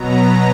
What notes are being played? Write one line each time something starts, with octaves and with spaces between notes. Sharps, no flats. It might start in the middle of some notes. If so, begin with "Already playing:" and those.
Already playing: B2 F#3 B3 A#5